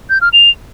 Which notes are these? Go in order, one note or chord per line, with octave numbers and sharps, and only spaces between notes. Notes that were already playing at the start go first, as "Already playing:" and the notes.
G6
F6
F7